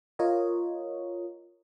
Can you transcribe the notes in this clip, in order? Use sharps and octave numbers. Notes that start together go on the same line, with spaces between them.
F4 A#4 C#5 D#5